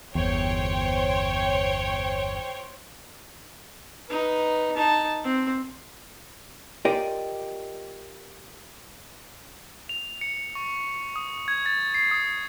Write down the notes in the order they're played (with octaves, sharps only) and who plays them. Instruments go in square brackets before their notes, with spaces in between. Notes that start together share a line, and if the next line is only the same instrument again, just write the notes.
[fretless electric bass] G1 E2 [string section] C5 C#5 G5
[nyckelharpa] D#4 B4
D#4 A5
C4
[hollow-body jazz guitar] F4 G4 A#4 D5 D#5 G5
[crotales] F7
C#7
C#6
D#6
G#6
A6
C7
D#6